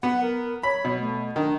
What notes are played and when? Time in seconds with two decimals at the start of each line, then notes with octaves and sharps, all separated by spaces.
0.03 B3 F#5
0.22 A#4
0.63 C#5 B5
0.85 B2
0.99 A3
1.36 D#3 D4